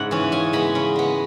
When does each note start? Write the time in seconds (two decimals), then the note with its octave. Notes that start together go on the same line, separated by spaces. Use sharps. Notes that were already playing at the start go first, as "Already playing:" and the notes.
Already playing: G#2 C#3 G#3 E4 E5 F#5
0.11 E3 C#4
0.32 C#3 G#5
0.53 G#3 B3 B5
0.75 C#3
0.96 G#3 B3